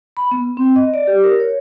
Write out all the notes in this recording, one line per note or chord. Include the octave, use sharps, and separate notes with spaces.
B5
B3
C4
D#5
D5
G4
A#4
C#5